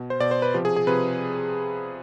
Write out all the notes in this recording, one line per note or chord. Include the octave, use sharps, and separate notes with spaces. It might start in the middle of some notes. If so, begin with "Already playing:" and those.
Already playing: B2
C5
B2 D5
C5
B4
C3 F3 G4
G#4
G#4
C3 F3 B4